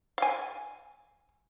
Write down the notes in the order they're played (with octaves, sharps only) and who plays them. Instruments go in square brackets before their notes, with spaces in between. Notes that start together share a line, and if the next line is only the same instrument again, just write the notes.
[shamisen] F5 G#5